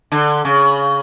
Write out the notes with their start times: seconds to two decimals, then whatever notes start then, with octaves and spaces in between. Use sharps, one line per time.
0.12 D3
0.45 C#3